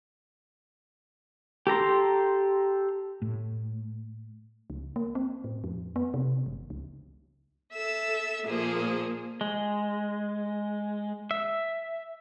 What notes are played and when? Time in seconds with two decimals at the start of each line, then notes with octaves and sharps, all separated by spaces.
1.67 G4 A4 A#5 C6
3.22 A2
4.70 C#2
4.96 A#3
5.15 C4
5.44 A2
5.64 F2
5.96 B3
6.14 C3
6.46 G1
6.70 C#2
7.73 A4 E5 E6
8.46 A#2 F3 A#3 G#4
9.41 G#3
11.31 E5